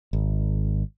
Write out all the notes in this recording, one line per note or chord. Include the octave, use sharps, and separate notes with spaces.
G#1